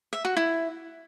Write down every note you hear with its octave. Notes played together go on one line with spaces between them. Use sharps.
E5
F#4
E4